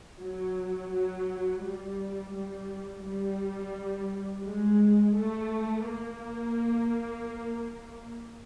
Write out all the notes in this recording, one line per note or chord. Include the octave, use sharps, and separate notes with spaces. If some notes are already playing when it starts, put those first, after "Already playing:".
F#3
F#3
G3
G3
G3
G#3
A3
A#3